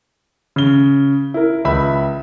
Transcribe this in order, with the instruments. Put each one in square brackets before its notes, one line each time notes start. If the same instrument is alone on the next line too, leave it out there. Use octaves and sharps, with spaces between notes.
[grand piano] C#3 G7
E4 A#4
C#2 E5 B5